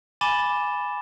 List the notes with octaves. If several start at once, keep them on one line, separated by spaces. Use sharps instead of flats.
G#5 B5 D6 A6 E7 G7